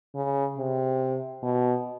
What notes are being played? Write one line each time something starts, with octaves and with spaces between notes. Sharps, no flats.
C#3
C3
B2